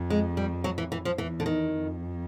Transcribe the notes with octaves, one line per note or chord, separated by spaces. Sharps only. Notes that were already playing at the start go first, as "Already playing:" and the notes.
Already playing: F2
G#3
G3
F#3
E3
E3
F3
E2 E3
D3
D#3
F2